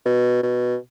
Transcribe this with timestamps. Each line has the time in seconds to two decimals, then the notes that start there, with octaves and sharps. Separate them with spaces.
0.06 B2
0.43 B2